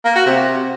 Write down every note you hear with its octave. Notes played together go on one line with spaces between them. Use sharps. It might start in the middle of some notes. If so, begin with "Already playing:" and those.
A#3
F#4
C3